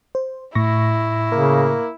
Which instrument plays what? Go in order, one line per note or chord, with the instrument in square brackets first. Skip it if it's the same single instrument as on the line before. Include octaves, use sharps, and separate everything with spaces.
[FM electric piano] C5
[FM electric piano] A2 C#6 A#6 [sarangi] E4
[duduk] C#3 [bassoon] A#3